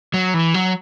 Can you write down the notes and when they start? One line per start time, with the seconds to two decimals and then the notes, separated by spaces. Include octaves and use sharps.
0.14 F#3
0.34 E3
0.54 F#3